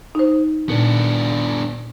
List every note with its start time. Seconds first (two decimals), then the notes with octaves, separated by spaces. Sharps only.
0.15 D#4 C5
0.69 A#2 B3 D4